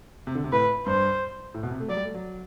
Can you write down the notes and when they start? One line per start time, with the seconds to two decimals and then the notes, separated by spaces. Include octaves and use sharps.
0.27 C3
0.35 D3
0.44 C3
0.52 A2 B4
0.86 G2 C5
1.54 A2
1.63 B2
1.71 C3
1.80 A3
1.88 F#3 D5
1.96 G3
2.05 A3
2.14 F#3